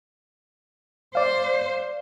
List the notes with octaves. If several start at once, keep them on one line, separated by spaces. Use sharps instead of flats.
C5 D5 F5